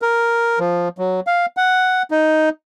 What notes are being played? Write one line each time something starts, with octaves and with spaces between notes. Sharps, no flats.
A#4
F3
F#3
F5
F#5
D#4